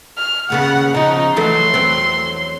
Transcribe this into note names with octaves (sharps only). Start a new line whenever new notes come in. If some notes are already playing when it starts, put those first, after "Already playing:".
F6
D#2 C#3 B3 F#5
C#3 F3 D#4
E3 F#3 A3 C6
E2 F#3 C4